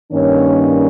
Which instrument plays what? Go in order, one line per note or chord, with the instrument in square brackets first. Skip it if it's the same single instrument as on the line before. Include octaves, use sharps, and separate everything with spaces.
[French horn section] G2 D#3 A#3 C#4 C#5